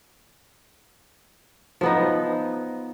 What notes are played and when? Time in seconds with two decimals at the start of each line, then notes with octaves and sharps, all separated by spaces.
1.81 F3 B3 D#4